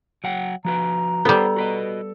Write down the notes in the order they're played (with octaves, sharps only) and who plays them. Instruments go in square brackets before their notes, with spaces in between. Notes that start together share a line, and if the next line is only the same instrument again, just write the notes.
[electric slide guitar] F#3 F#5 G5
[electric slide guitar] F3 F#4 B4 [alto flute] A#5
[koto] G3 B3 [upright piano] A4 [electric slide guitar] C5 F#5
[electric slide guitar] F#4 B4 D#5